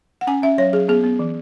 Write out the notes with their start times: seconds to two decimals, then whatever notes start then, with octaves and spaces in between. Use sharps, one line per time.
0.21 F#5
0.27 C#4 G#5
0.43 C#4 E5
0.58 F#3 C#5
0.73 F#3 G#4
0.89 B3 G#4
1.04 B3
1.19 E3